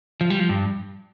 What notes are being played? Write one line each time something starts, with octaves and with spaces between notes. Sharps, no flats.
F3
G3
F3
G2